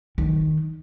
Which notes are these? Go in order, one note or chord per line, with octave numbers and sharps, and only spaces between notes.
D#3